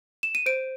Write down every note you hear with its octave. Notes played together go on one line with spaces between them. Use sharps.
E7
D#7
C5 D7